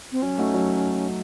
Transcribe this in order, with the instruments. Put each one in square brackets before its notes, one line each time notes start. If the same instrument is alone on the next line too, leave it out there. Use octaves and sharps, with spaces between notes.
[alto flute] C4
[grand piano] F#3 [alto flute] C#4
[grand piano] A3 D#4 F#4
F#3